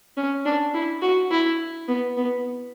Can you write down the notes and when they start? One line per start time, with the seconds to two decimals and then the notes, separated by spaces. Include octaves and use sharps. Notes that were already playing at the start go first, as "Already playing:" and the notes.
0.17 C#4
0.45 D4
0.74 E4
1.02 F#4
1.31 E4
1.88 B3
2.17 B3